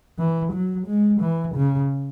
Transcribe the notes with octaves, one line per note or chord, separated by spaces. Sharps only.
E3
F#3
G#3
E3
C#3